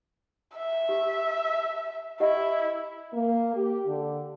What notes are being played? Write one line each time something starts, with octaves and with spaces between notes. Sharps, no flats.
E5
G4
E4 G4 D#5 F#5
A#3
G4
D3